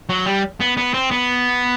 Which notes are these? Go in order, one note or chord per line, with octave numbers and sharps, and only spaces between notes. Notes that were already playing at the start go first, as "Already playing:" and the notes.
F#3
G3
B3
B3
C4
B3